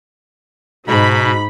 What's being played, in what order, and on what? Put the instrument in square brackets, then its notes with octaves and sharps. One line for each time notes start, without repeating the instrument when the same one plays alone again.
[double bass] G#2 [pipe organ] B2 [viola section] D#4 B5